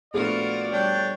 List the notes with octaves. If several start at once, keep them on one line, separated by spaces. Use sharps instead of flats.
A#1 A3 B3 F4 F#4 A#4 D5
G3 D4 C#5 G5